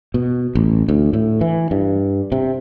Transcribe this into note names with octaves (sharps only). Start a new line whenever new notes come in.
B2
A1
D2
A2
E3
G2
C3